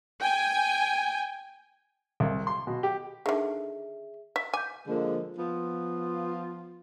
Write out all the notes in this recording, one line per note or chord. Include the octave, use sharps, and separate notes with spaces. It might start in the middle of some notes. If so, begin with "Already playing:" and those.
G5 G#5
C2
C6
B2
G4
D3 D#3 G#4 E5
E5
G#5 D6 G6
D3 F3 G#3 A#3
F3 B3 F4